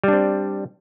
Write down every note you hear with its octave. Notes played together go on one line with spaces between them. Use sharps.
G3 C4 D4